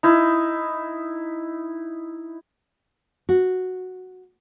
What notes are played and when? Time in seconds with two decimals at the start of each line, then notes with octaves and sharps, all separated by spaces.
0.03 D#4 E4
3.29 F#4